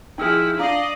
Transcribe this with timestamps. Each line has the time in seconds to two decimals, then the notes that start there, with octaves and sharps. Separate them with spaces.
0.18 F3 D#4 E4 G#4 G5 E6 F6
0.59 D4 D5 D#5 F5 A#5 D#6 C7